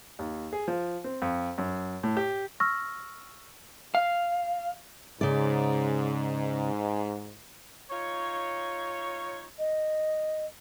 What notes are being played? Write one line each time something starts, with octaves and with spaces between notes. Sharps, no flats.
D#2
G#4
F3
C4
F2
F#2
A2
G4
C#6 E6 F6 A#6
F5
G#2 C#3 D5
D#4 F4 C#5
D#5